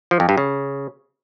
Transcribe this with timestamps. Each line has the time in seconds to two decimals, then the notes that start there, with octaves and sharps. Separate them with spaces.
0.11 F3
0.20 F2
0.29 G2
0.37 C#3